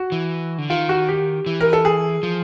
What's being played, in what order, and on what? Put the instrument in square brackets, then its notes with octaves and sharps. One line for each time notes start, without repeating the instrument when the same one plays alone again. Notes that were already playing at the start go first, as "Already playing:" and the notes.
Already playing: [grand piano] F#4
[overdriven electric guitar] E3
D3
[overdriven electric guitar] D#3 [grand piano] F4
[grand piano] F#4
G4
[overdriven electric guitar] E3
[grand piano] A#4
A4
G#4
[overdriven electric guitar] F3